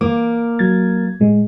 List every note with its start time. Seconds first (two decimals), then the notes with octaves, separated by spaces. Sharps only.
0.01 A#3 D6
0.59 F#3 G#6 A6
1.20 A2 G#3